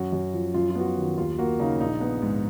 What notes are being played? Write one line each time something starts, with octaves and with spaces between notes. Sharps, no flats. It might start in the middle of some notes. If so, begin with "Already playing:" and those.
Already playing: F#2 F#4
F#2
F3
F#2 F4
F4
B3 F#4
F4
D#3
F#4
D#2 F4
A#3 F#4
C#3 D#4
A#1 D#4
B3
G#2